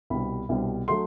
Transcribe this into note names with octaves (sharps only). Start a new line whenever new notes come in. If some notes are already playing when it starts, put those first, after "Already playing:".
C2 B2 G3 B5
C2 B2 G3
F#3 A3 C6